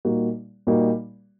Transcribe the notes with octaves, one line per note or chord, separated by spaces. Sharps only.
A#2 G3 A#3 D#4 F#4
A#2 G3 A#3 D#4 F#4